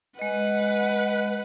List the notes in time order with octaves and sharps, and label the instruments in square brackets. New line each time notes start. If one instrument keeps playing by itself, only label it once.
[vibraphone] G#3 D#5 [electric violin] B4 F#5